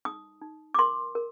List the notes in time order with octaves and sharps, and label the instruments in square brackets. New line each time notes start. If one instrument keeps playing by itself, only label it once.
[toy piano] D#4 D#6
D#4
D6
A#4 C6
A#4